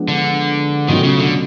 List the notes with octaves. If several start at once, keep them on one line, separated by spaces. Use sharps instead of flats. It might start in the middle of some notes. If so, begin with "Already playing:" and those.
Already playing: F3 G#3 B3 D4
D3
B2 D#3 F#3 A3 C#4 F4
C#3
D3